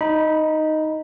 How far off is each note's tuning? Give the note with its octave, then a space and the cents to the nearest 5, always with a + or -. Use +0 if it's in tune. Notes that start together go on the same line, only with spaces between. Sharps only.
D#4 +0 B5 -20